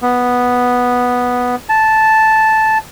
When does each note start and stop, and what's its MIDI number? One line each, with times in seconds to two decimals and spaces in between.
0.02 1.56 59
1.69 2.78 81